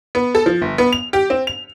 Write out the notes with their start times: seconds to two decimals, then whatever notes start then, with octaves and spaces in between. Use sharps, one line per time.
0.15 B3
0.35 A4
0.46 F3
0.62 G1
0.78 B3
0.93 F7
1.13 G4
1.30 C4
1.47 F7